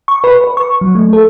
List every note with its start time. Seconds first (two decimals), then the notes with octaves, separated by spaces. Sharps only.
0.08 C#6
0.24 B4
0.44 B4
0.57 C#6
0.81 F#3
0.95 A3
1.13 A4